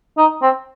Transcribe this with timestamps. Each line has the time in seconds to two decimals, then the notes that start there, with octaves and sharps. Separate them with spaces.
0.17 D#4
0.42 C4